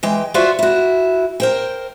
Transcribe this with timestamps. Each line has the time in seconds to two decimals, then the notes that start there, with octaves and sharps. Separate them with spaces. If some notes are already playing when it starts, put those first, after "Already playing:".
0.03 E3 G#3 G5
0.34 F4 F#4 C5 D5 E5
0.59 E4 F#4
1.40 A#4 C5 G5